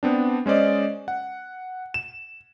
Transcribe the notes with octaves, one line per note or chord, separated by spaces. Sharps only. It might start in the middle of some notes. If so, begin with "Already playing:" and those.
B3 C4 D4
G#3 C#4 C5 D5 D#5
F#5
E7